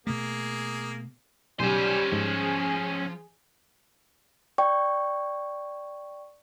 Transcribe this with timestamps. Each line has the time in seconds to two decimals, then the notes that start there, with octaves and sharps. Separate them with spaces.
0.07 B2 A3 A#3 G#4
1.60 B1 G3 C#4 C5 G#5
2.12 G#2 F3 G#4
4.58 D5 G5 C#6